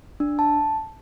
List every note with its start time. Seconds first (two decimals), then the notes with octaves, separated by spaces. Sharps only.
0.20 D4
0.39 A5